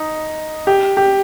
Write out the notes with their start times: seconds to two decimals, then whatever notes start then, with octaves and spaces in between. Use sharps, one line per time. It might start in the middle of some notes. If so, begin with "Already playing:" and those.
Already playing: D#4
0.67 G4
0.97 G4